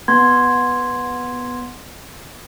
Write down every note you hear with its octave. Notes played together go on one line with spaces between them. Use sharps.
B3 C6 G#6